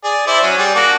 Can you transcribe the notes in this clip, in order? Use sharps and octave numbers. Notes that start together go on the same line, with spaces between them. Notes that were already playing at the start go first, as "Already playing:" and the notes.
G#4 D5
E4 C5 D5
F#3 C#4
G3 G#4 D5
A#3 D4 F#4